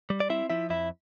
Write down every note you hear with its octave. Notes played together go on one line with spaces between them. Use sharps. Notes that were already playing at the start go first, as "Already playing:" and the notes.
G3
D5
C4 E4 E5
F3 E4 E5
F2 E4 E5